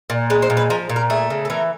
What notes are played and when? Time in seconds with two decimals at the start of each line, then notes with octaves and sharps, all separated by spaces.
0.10 A#2
0.30 G#3 B4
0.42 C5
0.50 A#2
0.57 B4
0.70 F3 A#4
0.89 A#2
0.96 A#4
1.10 A3 G#4
1.30 C#3
1.45 A4
1.50 E3 A#4